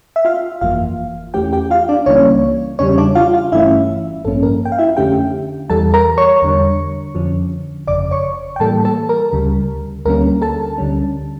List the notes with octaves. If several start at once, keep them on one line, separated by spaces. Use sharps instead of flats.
E5
F4 F5
G1 F2 E3 A#3 F4 F5
E2 E3 A3 C#4 G4 G5
G4 G5
F4 F5
D4 D5
C#2 C#3 E3 G3 A#3 C#4 C#5
E2 C#3 G3 C#4 C#5
D4 D5
F4 F5
F4 F5
G1 G2 E3 A3 C#4 E4 E5
A1 G2 F3 A#3 C#4 A4
A#4
G5
F5
E4 E5
F2 D3 A3 C#4 G4 G5
E2 E3 G3 A4 A5
A#4 A#5
C#5 C#6
E2 D3 G3
F2 D3 F3 C#4
G1 F2 C#3 D5 D6
C#5 C#6
G5
A2 E3 G3 A#3 A4 A5
A4 A5
A#4
D2 C#3 G3
D2 D3 G3 A#3 C#4 A#4
A4 A5
D2 D3 G3 C#4